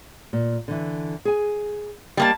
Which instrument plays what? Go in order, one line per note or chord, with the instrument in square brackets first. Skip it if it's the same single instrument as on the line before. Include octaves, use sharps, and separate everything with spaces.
[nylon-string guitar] A#2
D3 E3
G#4 G#5
[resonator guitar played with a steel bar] G3 A#3 A5 [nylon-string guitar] D#5